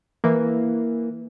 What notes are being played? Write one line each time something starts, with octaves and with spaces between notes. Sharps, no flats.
E3 A#3